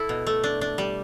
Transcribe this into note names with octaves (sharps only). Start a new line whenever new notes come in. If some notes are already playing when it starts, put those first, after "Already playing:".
Already playing: E4 A4
B2
A3
D4
D4
G3